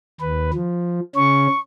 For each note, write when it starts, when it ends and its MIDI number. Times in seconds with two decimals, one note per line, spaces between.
0.21 0.51 39
0.21 0.51 71
0.54 1.00 53
1.16 1.47 49
1.16 1.47 61
1.16 1.60 85